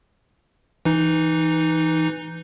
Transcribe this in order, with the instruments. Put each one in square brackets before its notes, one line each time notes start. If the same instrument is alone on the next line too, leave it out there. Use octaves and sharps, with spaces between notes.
[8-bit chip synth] E3 D#4